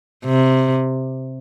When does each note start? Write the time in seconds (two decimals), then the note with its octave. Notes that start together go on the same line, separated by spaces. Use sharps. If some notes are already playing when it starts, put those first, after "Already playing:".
0.25 C3